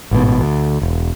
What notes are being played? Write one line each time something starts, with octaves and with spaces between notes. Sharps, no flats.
A1 G#2 B2
D2
E1